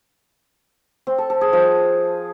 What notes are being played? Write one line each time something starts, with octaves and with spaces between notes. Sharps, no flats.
C4
A4
A4
G#4
F3